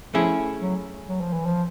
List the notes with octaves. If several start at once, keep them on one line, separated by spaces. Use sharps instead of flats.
F3 A3 C#4 E4 G#4
F#3
F#3
F3
E3
F3